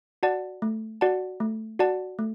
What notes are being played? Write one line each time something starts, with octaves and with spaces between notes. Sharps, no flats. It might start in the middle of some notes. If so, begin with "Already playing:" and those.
F#4 D5 F#5 A5
A3
F#4 D5 F#5 A5
A3
F#4 D5 F#5 A5
A3